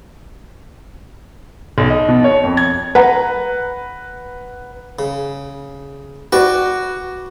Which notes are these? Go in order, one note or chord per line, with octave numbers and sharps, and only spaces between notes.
B1
D#5
B2
C#5
F2
G#6
B4 F#5 A#5
C#3
F#4 B4 D5 G5